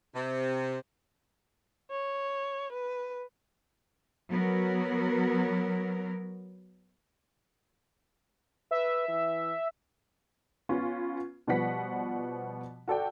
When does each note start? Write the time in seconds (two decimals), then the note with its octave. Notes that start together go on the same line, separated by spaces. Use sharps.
0.14 C3
1.91 C#5
2.72 B4
4.30 F#3 B3 A#4
8.71 B4 E5
9.08 E3
10.69 B3 C#4 F4
11.47 B2 F3 G3 B4 F#5 B6
12.88 F#4 A4 D5 G5